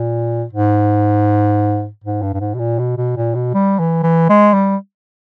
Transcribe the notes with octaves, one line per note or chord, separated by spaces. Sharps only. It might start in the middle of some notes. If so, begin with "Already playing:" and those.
Already playing: A#2
G#2
G#2
G2
G2
G#2
B2
A#2
B2
B2
A#2
B2
G3
E3
E3
G#3
G3